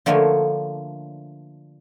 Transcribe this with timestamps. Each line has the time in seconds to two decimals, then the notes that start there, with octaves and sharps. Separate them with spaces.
0.06 D3 F3 A3 A#3 C#5 G#5